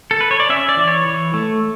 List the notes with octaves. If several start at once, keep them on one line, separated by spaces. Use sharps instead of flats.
A4
B4
C#5
D5
C#4 E5
D5
E3
C#5
E3
A3